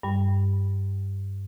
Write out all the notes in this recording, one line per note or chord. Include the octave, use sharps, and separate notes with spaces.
G2 G3